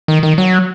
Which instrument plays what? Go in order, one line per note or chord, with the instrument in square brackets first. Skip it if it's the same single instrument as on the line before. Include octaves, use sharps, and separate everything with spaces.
[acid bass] D#3
D#3
F#3